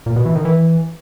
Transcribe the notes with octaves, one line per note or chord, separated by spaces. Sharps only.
A#2
B2
E3
D#3
E3